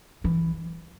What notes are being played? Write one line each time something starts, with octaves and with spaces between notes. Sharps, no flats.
E3